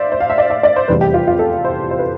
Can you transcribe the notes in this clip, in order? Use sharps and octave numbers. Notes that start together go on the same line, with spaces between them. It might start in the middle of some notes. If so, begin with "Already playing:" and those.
Already playing: C5 D5 E5 F5
C5
F5
E5
D5
E5
D5
C5
F1 E2 C3 E3 G3 B4
G4
F4
F4
A4
C5
C5
B4